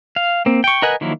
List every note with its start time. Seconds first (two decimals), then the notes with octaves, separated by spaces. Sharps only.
0.16 F5
0.46 A#3 C4
0.64 G5 C#6
0.82 A#4 B4 D#5 F#5 G#5
1.01 D#3 F3 F#3 A#3 E4